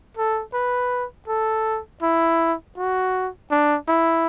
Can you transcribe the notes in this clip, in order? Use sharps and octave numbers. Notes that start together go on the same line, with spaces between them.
A4
B4
A4
E4
F#4
D4
E4